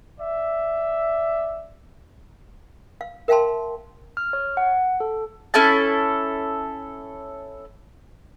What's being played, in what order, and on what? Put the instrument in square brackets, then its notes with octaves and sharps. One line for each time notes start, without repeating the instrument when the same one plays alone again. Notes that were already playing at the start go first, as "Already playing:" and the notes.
[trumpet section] D5 E5
[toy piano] F5
A#4 E5 F5 G5 A5 C6
[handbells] F6
C#5
F#5
A4
[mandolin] C#4 E4 A4 A5